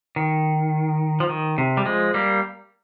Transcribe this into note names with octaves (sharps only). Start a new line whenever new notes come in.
D#3
F3
D#3
C3
G3
F3 G#3
G3 A#3